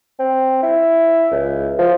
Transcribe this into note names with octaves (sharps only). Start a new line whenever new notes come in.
C4
E4
C#2
F3